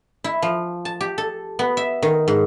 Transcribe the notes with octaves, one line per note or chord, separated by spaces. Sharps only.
E4
F3
A5
G4
A4
B3
E5
D#3
G#2